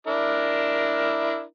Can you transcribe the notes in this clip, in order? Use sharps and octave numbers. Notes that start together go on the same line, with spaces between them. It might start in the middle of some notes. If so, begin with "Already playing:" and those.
D4 E4 A#4